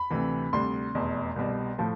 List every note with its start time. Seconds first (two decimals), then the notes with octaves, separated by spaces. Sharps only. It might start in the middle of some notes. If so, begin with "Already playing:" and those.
Already playing: B5
0.10 D2 C3 E3
0.53 D2 C3 G3 C6
0.95 F1 E2 B2
1.36 C2 B2 G3
1.78 A2 F3 A3